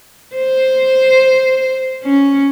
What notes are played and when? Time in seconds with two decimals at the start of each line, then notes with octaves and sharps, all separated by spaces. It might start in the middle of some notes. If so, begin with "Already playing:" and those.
0.36 C5
2.03 C#4